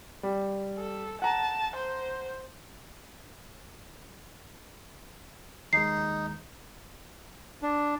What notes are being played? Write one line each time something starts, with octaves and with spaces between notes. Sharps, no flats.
G3
A4
F#5 A5 A#5
C5
D#2 G#3 D#4 C7
D4